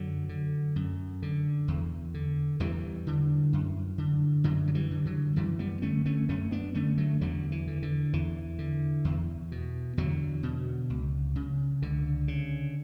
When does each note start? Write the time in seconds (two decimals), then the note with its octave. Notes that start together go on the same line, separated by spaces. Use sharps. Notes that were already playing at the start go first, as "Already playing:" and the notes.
Already playing: F#2 D3 F#3
0.29 D3
0.76 F#2
1.22 D3
1.68 E2
2.14 D3
2.60 E2 E3 G3
3.07 D3
3.53 F#2
3.98 D3
4.44 F#2 D3 F#3
4.68 F#3
4.75 E3 G3
4.91 D3
5.05 D3 F#3
5.36 F#2 E3 G3
5.59 G3 B3
5.82 D3 A3 C#4
6.06 A3 C#4
6.29 F#2 A3 C#4
6.51 B3 D4
6.74 D3 A3 C#4
6.98 F#3 A3
7.21 E2 D3 F#3
7.52 E3
7.67 D3
7.82 D3
8.13 E2 E3
8.59 D3
9.05 E2
9.52 B2
9.98 E2 D3 F#3
10.43 B2
10.90 C#2
11.35 C#3
11.82 C#2 D3
12.28 C#3